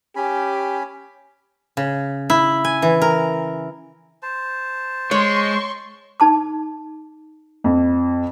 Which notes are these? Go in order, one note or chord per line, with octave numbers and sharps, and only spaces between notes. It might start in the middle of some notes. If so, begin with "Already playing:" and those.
C#4 G4 G#5 B5
C#3
E4
G#5
E3
A#4
C5 A5
G#3 C#5 C6 C#6
D#4 A5 D6
F2